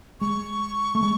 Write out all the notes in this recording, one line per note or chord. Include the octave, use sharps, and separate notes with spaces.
G#3 C#6
A3
G#3